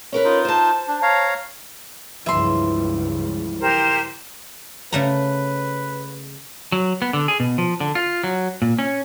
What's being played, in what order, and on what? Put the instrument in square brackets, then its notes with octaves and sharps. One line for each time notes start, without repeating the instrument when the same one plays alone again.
[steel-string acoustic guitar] C#4 A#4 B4
[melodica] D#4 F4
[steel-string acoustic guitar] C5 A5
[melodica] D4
C#5 F5 A#5
[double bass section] C#2 G2 F3 [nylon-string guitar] E3 [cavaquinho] E5 C6
[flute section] G4 A#4 C5
[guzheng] C#3 A3 A#5 [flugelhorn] B4
[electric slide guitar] F#3
B3
D3
G#4
B2
F3
D3
F4
F#3
A#2
C#4